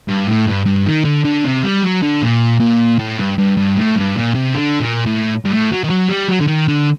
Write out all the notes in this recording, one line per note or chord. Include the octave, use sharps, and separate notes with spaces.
G2
A2
G2
G2
D#3
D3
D3
C3
G3
F#3
D3
A#2
A#2
A2
G2
G2
G2
A2
G2
A#2
C3
D3
A#2
A2
G2
A2
F#3
D#3
F#3
G3
F#3
D3
D#3
D3